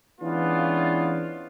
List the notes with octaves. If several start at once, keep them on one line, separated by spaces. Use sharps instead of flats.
E3 G#3 B3 C#4 D4 F4